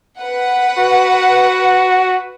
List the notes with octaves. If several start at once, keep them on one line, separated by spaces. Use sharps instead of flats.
B4 F#5
F#4